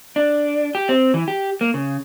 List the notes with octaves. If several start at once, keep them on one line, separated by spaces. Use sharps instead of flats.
D4
G4
C4
E3
G4
A#3
C#3